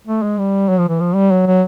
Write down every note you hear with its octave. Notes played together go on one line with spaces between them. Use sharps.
A3
G#3
G3
F#3
F3
E3
F3
G3
F#3
F#3